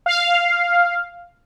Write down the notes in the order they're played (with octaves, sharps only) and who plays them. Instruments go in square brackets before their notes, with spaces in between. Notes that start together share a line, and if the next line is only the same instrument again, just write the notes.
[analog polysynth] F5